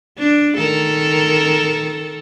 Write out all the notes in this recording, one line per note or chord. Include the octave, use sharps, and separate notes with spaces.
D4
D#3 A4 A#4